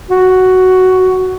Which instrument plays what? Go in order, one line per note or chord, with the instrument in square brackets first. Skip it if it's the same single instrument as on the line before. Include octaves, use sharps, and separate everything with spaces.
[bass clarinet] F#4